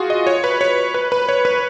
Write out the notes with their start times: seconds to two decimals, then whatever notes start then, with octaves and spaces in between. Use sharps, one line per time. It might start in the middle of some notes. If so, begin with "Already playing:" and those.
Already playing: F4 F#4 G#4
0.10 D#5
0.27 C#5
0.44 B4
0.61 C#5
0.94 B4
1.12 B4
1.29 C#5
1.45 B4